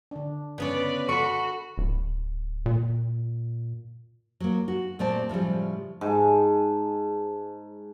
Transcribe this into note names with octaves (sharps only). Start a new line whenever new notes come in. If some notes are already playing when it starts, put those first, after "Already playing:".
D3 D4
C#3 B3 B4 C#5 D5
F#4 A4 B5 C#6
D1
A#2
F#3 A#3
F#4
A#2 A3 C4 D5 A5
A2 C#3 F3 G3
G#2 A5